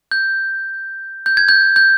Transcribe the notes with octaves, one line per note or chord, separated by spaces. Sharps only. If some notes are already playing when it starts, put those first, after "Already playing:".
G6
G6
G#6
G6
G6